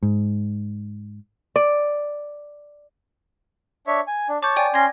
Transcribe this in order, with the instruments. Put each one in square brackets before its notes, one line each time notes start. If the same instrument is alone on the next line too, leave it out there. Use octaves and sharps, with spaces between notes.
[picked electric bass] G#2
[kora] D5
[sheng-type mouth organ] D4 C#5 E5
G#5
D4
[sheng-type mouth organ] C#5 A5 [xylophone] D6 G6
[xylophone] D5 G5 G#5
[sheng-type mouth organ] C#4 C6 [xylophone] G#6 A#6